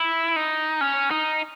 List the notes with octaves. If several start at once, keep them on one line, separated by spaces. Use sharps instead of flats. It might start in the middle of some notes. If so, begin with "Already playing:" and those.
Already playing: E4
D#4
C#4
D#4